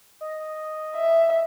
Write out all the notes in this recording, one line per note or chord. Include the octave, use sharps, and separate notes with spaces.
D#5
E5